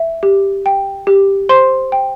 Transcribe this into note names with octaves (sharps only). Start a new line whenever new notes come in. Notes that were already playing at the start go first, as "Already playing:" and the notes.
Already playing: E5
G4
G5
G4
C5 C6
G5